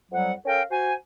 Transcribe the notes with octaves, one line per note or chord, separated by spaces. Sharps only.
F2 F#3 G3 F#5
C#4 A4 A#4 F5 G5
F#4 C5 G#5